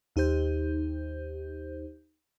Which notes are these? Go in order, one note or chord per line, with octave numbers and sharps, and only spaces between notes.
D#2 D#4 G4 C5 G6